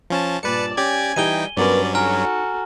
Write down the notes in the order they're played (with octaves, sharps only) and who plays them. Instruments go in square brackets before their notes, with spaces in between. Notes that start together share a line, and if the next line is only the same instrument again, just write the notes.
[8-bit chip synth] F3 C#4 A5
[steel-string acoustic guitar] G2 A#2 [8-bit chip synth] B4 C#7 [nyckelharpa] D5 A5
[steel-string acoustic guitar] C#4 [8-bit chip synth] G4 D5 G#6 [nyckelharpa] G#5
[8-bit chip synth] E3 D#4 G5 [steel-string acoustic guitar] G3 G4 D#5 [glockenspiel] D#7 G7
[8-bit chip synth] G2 F#3 C#4 [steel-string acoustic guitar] B3 A#4 B4 [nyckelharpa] D5
[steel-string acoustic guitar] D#4 [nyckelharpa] F#4 A4 [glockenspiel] G#5 A#5 F6